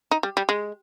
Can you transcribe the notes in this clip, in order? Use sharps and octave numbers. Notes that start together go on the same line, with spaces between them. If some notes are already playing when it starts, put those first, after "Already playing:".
D#4
G3
G3
G#3